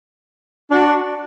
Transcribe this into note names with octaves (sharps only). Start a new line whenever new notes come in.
D4 F#4